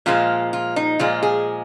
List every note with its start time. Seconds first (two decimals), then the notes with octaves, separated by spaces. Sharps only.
0.06 A#2 F3 G#3 F4
0.53 F4
0.76 D#4
0.99 A#2 F3 G#3 F4
1.23 G#4